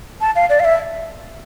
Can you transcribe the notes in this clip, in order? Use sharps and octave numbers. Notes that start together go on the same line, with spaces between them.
A5
F5
D5
F5
E5